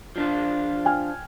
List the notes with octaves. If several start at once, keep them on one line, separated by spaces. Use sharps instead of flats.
F3 D4 F4
G5 G#5 F6